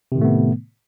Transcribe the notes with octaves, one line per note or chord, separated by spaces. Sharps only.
A2 C3 D#3 A3 B3